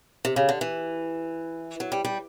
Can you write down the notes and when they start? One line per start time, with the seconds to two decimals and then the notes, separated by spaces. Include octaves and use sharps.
0.25 C3
0.36 C#3
0.49 D3
0.61 E3
1.80 F#3
1.92 G3
2.05 G3